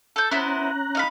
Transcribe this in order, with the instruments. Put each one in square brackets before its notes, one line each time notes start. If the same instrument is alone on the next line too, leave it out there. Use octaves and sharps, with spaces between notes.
[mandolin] A4 G6
[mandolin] B3 E4 C5 [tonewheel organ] C#4 A#5 F#6
[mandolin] D#4 F5 B5